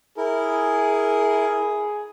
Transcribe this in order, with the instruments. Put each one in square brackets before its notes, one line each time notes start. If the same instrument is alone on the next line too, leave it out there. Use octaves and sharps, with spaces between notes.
[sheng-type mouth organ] E4 A#4 [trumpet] G#4